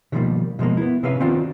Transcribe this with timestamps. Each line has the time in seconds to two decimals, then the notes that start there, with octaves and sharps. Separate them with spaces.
0.12 B2 D3 D#3 F3 G3 A#3
0.59 B2 F3 G#3 A#3
0.77 B3 E4
1.03 C3 C4 C#4 B4 F5
1.20 D#3 C4 D4 F4 F#4